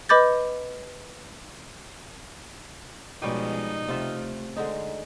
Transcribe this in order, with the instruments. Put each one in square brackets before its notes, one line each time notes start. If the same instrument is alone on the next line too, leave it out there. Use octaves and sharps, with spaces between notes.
[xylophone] B4 D#5 B5 D6 G6 A6
[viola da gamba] B2 F3 G#3 [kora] G3 C#4 G4 [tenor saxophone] D#4
[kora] C3 F4 E5 [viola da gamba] A3
[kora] D3 G#3 D#4